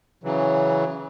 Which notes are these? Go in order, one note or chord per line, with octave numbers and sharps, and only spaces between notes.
C#3 E3 F#3